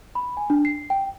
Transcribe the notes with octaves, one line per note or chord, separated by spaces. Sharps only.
B5
G#5
D4
C7
G5